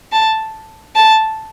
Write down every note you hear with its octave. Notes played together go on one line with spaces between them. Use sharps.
A5
A5